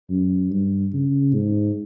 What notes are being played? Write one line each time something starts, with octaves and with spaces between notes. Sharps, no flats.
F#2
G2
C#3
G#2